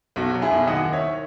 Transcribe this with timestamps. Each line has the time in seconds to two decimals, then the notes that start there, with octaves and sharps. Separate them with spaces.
0.16 B1 F#4
0.33 F#3
0.42 E4 G#4
0.51 B1
0.67 D#2 D#5 F#5
0.85 D#3
0.93 C#5 E5